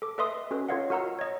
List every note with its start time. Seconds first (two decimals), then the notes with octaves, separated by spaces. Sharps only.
0.02 A4 D6
0.18 A4 B4 D#5 E5 C6 D#6
0.51 C#4 F#4 A4 B4
0.68 F4 A4 C#5 D#5 F5 F#5
0.90 F#4 A#4 F#5 A#5 E6
1.19 C#5 D#5